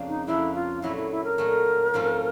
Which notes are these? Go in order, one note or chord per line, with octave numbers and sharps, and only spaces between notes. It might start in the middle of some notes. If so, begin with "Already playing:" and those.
Already playing: F2 C#3 F3 A#3 D4
D#4
F2 C#3 F3 A#3 D4 E4
F4
A#2 F#3 A3 E4
E4
E4
A#4
A#2 F#3 A3
G#2 F3 A3 C4 F4